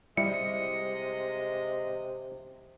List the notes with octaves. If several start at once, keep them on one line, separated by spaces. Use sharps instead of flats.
C3 G3 G#3 E4 D#5 C#7